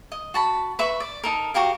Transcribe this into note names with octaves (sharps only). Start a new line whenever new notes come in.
D#5
F#4 A5 B5
B4 E5 B5 C#6
D5
D#4 A4 A#4
F#4 G4 A#4 F5